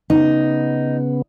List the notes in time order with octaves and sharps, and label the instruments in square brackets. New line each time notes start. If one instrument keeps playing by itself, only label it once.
[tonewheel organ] C#3 B3 [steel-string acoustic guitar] D#4